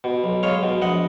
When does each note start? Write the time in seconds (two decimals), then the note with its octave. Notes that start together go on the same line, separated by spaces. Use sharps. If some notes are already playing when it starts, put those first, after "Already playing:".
0.04 B2
0.24 B1
0.43 G#3 C#5 F5
0.63 B2
0.82 A#1 D#5 F#5